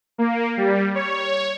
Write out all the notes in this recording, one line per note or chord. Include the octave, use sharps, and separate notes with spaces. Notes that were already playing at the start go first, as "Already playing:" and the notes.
A#3
G3
C#5